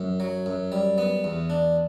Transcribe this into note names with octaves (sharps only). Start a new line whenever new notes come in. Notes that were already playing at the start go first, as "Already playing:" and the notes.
Already playing: F#2
F#3
F#2
G3
B3
E2
D4